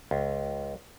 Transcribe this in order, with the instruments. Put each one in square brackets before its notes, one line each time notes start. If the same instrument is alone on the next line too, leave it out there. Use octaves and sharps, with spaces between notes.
[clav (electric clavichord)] C#2